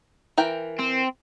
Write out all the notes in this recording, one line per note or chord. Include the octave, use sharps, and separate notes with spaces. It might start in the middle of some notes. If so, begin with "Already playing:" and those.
E3 A#4 G5
C4